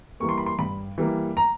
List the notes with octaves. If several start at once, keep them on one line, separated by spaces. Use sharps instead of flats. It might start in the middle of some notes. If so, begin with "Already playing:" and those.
E3 G3 A#3 C#6
C6
B5
C6
G2 B5
E3 G3 A#3
A#5